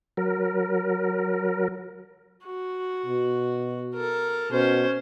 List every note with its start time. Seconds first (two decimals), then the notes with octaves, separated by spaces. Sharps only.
0.17 F#3 A#4
2.46 F#4
3.06 B2
3.95 A4 A#4
4.52 B2 C#4 C5